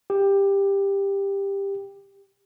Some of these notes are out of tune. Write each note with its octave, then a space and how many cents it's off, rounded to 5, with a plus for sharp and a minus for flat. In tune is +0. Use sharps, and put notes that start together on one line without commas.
G4 +15